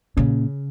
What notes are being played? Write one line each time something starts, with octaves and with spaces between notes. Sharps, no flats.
A#2 C#3 A#3 C#4